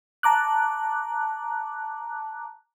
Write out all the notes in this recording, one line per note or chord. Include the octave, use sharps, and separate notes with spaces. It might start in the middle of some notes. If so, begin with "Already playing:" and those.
A5 A#5 D6 F#6